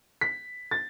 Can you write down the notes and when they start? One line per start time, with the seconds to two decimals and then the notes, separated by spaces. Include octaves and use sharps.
0.21 B6
0.71 A6